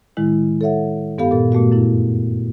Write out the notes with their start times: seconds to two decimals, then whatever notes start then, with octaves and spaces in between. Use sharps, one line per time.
0.17 A2 D#3 G#3 E4
0.61 A4 C#5 E5 F#5
1.18 G2 B3 G4 A4 F5
1.31 A#2 A4
1.52 A#2 A3 B3 F#4
1.72 F#2 E4